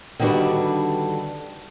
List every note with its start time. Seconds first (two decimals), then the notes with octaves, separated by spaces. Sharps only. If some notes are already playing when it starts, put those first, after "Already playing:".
0.20 D3 D#3 G3 D4 F#4 B4